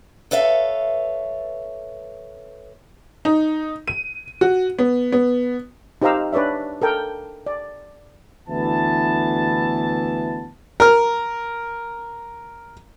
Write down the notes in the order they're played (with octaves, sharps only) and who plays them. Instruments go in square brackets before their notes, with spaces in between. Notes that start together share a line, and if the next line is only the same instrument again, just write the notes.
[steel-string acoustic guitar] A4 B4 C#5 E5 F5
[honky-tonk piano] D#4
D#7
F#4
B3
B3
[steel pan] D#4 G4 C5 F5 A#5 E6
D4 B4 C#5 D5 E5
A4 A#4 G5
D5
[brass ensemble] D2 E3 B3 A5
[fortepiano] A#4 F6